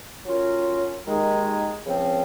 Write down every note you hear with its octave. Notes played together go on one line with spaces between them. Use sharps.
F#3 C#4 F4 A#4
D#2 D#3 G#3 D#4 G#4
C#2 C#3 F3 C4